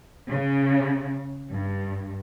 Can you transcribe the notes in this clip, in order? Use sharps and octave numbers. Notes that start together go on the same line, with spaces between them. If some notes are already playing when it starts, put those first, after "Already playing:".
C#3
G2